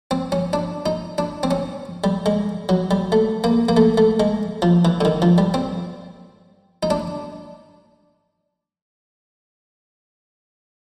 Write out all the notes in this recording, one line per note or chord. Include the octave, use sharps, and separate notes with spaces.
C4
C#4
D4
D#4
D4
C4
C#4
G3
G#3
F#3
G3
A3
A#3
A#3
A3
A3
G#3
F3
E3
D3
D#3
F3
G3
C4
D#4
D4